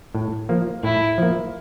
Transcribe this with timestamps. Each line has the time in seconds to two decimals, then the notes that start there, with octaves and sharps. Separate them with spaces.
0.15 A2
0.49 F3 A#3
0.83 A2 E4
1.18 F3 A#3